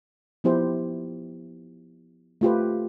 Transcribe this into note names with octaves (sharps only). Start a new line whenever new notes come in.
F3 B3 E4 G4 C5
A3 F4 G4 B4